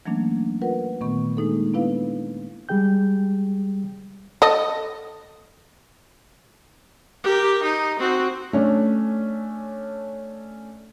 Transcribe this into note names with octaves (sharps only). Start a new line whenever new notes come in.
E3 F#3 A3 A#3 C#4 D4
F4 A#4 B4 F#5
A#2 D#3 A3 B3 C#6
G#3 A#3 D4 D#4 G#4 A4
B3 D4 E4 B4 F5
G3 G#3 G#4 G5 G6
A4 D#5
G4 A#4
D#4
C4 F#4
A3 C#4 D4